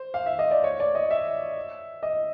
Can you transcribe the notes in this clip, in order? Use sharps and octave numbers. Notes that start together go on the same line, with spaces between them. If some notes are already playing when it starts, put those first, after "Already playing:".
Already playing: C5
F5
E5
D#5
D5
C#5
D5
D#5
E5
D#5